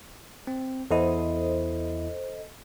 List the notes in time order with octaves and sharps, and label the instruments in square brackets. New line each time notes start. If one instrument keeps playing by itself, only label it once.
[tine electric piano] C4
[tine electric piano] E2 E4 [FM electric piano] A4 C5 D#5